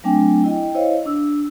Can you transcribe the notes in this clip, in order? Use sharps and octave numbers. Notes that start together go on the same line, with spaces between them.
F#3 A3 C4 D4 G5 G#5
E4 D#5 G5
E4 C5 C#5 D#5 F5
D4 E6